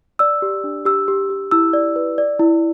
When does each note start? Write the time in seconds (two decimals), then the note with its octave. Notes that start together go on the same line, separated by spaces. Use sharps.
0.19 D5 E6
0.42 G4
0.64 D4
0.85 G4 E6
1.08 G4
1.30 G4
1.51 E4 E6
1.73 D5
1.96 B4
2.18 D5
2.40 E4